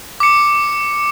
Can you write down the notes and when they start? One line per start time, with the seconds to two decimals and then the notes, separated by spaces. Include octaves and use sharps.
0.20 D6 C#7